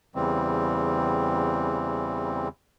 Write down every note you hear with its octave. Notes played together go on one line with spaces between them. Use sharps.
E2 C#3 E3 G3 C4